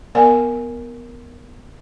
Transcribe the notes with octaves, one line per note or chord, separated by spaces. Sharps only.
B3 A#4 D5 F5 G#5